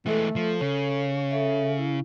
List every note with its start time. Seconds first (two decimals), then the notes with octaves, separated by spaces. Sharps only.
0.06 E3 G#3 A3 A4
0.36 F3
0.61 C#3 C#5
1.31 A4 E5
1.78 E4